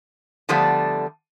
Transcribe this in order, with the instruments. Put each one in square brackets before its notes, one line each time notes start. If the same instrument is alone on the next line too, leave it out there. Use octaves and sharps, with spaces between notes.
[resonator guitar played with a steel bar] D3 F3 G3 A3 B3 D4